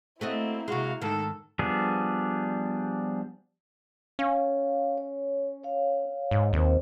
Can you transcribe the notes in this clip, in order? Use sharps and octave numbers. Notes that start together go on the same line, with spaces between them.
A3 A#3 C4 E4 F#4 D#5
C3 G#3 F#4 F5
G#2 D#3 A4
F3 G3 B3 D4 G#4
C#4 F5
C#5
C#5 F5
G#2
D#2 C4 A#4 C5